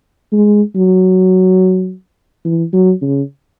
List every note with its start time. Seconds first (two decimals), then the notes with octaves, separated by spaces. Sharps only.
0.32 G#3
0.75 F#3
2.45 E3
2.72 F#3
3.02 C#3